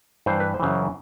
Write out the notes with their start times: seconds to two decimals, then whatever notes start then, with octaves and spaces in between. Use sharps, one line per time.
0.26 G2 E3 C5
0.40 B4
0.54 C5
0.60 F#2 C#3 E3